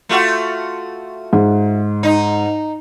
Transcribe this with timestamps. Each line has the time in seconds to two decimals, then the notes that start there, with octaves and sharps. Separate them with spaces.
0.09 A3 F4 F#4
1.33 G#2
2.03 D#4